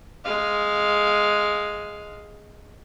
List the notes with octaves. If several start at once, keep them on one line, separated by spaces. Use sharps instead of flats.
G#3 F5